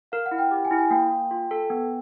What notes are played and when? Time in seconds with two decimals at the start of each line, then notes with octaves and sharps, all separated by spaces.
0.12 A#4 F5
0.26 F#5
0.31 E4
0.38 G5
0.51 G4
0.65 G#5
0.71 E4
0.78 G#5
0.91 A#3 G5
1.11 A#3
1.31 F4
1.51 A4
1.70 B3